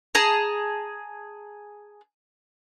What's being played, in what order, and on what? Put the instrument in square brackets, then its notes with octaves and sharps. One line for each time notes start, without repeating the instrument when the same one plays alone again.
[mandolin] G#4 A5 A#5